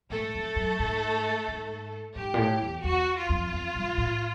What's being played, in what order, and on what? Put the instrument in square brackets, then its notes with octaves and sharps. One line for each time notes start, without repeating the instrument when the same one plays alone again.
[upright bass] G#2 [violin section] A3 A4
[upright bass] F2
F#2
G#2
G#2
[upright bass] G#2 [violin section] G4
[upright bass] A#2
A2
E2
[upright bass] E2 [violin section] F#4
[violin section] F4
[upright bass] F2
F2
G2
A2